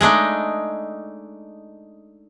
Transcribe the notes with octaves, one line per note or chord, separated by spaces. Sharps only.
G#3 A3 D4 D#4